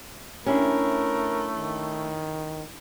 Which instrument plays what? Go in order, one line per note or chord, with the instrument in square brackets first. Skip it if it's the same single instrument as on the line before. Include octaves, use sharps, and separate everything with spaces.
[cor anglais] A3 [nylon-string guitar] C#4 [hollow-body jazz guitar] D4 E4 G4 [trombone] A#4
[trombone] D#3